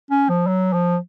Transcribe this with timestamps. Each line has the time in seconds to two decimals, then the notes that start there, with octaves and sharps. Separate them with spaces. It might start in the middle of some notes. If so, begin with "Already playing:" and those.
0.11 C#4
0.29 F3
0.47 F#3
0.73 F3